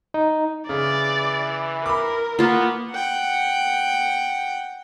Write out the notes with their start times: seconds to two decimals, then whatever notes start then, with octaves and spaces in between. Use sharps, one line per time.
0.14 D#4
0.69 C#3 E3 D5
1.86 A#4 B5 D6
2.39 A#3 B3 F4
2.91 F#5 G5